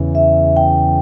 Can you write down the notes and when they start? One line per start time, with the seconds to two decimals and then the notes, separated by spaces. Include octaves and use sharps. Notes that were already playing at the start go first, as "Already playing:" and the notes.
Already playing: E2 C#3 E3
0.15 E5
0.57 G5